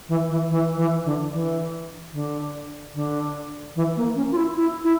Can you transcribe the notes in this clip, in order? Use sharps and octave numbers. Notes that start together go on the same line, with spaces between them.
E3
E3
E3
E3
D3
E3
D3
D3
E3
A#3
C#4
F4
E4
E4
E4